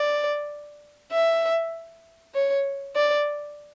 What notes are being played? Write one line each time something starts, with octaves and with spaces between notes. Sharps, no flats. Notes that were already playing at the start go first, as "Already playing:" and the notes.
Already playing: D5
E5
C#5
D5